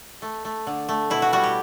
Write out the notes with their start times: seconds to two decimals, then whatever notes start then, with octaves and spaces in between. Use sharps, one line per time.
0.22 A3
0.45 A3
0.67 D3
0.89 A3
1.10 B2 E4
1.22 F#4
1.33 G3 F#4
1.43 G4